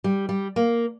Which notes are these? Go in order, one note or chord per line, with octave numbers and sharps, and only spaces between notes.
G3
G3
A#3